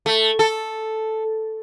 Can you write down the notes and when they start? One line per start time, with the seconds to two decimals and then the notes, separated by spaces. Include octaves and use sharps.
0.06 A3
0.39 A4